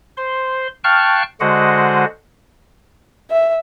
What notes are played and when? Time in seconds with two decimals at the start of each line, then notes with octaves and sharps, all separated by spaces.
0.17 C5 C6
0.84 F5 G5 A5 C#6 F6 F#6
1.40 D3 G#3 F#4 C5 D#5 F#5
3.30 E5